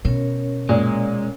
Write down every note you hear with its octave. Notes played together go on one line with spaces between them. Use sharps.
B2 C#4 A#4 C#5
A#2 G#3